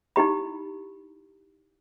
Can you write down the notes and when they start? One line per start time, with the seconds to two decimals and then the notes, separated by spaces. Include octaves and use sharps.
0.16 D#4 E4 G4 B5